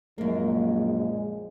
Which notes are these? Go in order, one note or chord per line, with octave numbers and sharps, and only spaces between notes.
A#1 F#2 G#3 A#3